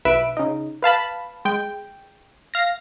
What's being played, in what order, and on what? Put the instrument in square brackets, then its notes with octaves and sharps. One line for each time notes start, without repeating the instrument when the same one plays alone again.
[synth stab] B1 B4 E5 D7
C#3 D#4
B4 F5 A5 B5
G#3 G5
F5 A#6